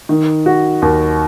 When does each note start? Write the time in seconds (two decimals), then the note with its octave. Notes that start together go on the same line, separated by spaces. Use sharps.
0.09 D#3
0.46 F#4
0.82 D#2